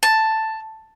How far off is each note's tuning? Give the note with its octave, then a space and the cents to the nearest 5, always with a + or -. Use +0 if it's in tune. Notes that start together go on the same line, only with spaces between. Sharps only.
A5 +5